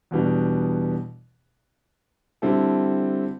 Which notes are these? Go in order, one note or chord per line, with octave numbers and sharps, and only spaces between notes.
E2 B2 G3 B3 D4
D3 G3 C4 E4 A4